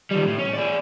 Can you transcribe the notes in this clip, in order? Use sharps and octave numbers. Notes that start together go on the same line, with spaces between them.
D#3 G3
A2
C#4
G#4 D5